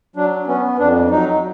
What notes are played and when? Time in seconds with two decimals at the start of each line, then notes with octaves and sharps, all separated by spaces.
0.16 F#3 D4
0.47 B3 C#4
0.79 F2 D4
1.10 F#3 D#4